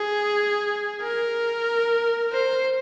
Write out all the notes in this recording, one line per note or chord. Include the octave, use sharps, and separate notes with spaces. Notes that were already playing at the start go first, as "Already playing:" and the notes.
Already playing: G#4
A#4
C5